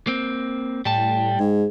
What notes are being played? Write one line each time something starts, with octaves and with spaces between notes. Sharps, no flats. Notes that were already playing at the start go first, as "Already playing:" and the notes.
A#3 C4
A2 G3 G5 A5
G#2 G#4